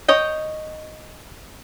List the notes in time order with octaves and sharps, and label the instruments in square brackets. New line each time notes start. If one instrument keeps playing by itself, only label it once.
[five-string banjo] C#5 D#5 G5